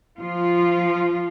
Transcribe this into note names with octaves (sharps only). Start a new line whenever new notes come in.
F3 F4